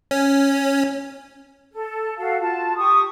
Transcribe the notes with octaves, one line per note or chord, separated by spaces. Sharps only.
C#4
A4
F#4 A4 F5
F4 A5
G4 C#6 D#6